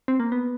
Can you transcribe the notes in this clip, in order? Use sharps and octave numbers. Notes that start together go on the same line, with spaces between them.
C4
A#3
B3